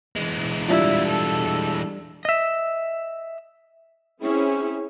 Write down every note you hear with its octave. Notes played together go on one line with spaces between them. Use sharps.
E3 G#3
G3 D4 E4 F4
A4
D#5 E5
C4 C#4 E4 G#4